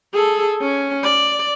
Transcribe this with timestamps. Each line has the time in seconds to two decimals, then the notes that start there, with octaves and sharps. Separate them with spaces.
0.13 G#4 A4
0.61 C#4
1.03 D5